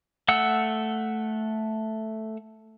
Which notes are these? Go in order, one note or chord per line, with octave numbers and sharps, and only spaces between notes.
A3 F#5 E6